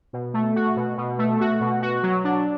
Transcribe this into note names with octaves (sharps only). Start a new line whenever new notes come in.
B2
A3
F#4
B2
B2
A3
F#4
B2
F#4
F#3
D4